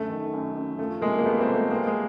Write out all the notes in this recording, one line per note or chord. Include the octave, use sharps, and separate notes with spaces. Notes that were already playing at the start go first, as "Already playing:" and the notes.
Already playing: F#2 D3 A3
D#3
F#2
F#2
F3 A3
C3 G#3 A#3
A#3
C2 A3 B3
A#3 C4
C2
A3
C3 G#3 A#3
G#3